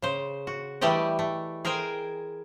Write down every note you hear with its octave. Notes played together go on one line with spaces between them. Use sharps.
C#3 C5
F#4
E3 G3 A3 G4 D5 D#5
A3
G#4 A#4 C5 G5 G#5